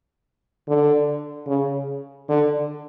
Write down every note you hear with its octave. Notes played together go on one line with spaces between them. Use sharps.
D3
C#3
D3